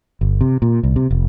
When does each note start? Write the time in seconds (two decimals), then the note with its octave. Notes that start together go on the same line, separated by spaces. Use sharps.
0.21 G1
0.41 C3
0.62 A#2
0.83 C2
0.96 C3
1.11 F1